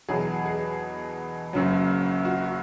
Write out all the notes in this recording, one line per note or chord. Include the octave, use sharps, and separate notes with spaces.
E2 B2 F#3 G#4
G#4
F#1 F#2 C#3 F#3
F#4